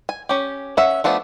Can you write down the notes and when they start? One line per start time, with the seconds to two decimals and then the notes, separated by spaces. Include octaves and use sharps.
0.09 G#5
0.29 C#4 G4
0.77 C#4 E5 F#5
1.04 F3 A3 B3 D4